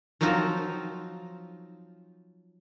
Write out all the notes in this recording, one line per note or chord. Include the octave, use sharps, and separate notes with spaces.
F3 F#3 C4 D#4 F4 C5